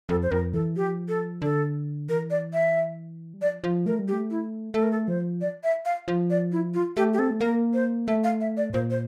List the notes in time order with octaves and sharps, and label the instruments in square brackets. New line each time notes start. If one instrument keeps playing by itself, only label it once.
[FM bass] F2 [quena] A4
[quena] C5
[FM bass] F2 [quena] A#4
[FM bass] E3 [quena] A4
[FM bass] F3 [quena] G4
[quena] A4
[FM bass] D3 [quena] A4
[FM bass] E3 [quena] A#4
[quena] D5
E5
[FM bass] G3
[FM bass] F3 [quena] D5
[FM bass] F3
[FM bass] A3 [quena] A#4
[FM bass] G3
[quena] G4
[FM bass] A3
[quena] E4
[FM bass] A3 [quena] A4
[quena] A#4
A4
[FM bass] F3 [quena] C5
[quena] D5
E5
F5
[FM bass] F3
[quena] D5
E4
F4
[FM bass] A3 [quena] G4
[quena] G4
[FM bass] C4 [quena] A4
[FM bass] A3
[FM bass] A#3 [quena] A#4
[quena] C5
[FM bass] A3 [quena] E5
[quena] F5
E5
D5
[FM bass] A2
[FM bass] A#2 [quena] C5
[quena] C5